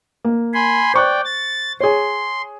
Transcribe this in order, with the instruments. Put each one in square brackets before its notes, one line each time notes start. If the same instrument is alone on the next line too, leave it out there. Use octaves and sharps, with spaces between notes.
[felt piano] A#3
[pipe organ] G#5 B5 C6
[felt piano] C5 C#6 F#6 [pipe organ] D5 G5
[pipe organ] A6
[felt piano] G#4 C#5 [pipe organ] C6